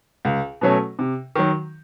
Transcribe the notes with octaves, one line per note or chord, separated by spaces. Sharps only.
C#2
B2 F#3 A3 C#4
C3
D#3 F#3